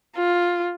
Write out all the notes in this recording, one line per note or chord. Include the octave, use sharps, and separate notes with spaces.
F4